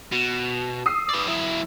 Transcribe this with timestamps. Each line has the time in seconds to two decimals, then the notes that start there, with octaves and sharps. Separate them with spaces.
0.12 B2
0.86 D#6 E6 C7
1.09 B4 D5
1.26 F#3 E4